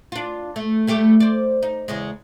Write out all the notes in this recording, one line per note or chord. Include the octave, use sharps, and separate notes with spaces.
D4 F4
A3
G3 A3 G4
C5 D5
D#4
E2 C#3 G#3